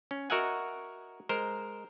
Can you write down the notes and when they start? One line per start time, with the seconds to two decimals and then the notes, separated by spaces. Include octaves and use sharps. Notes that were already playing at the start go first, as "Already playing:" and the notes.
0.11 C#4
0.30 F#4 A#4 D#5 E5 F#5 G#5
1.29 G#3 A#4 C5